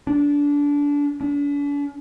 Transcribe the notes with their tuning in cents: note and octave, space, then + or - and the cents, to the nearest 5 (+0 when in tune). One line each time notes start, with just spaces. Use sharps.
D4 -25
D4 -45